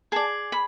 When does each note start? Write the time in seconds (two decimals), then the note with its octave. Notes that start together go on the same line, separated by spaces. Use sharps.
0.12 G#4 D5 A5
0.52 B5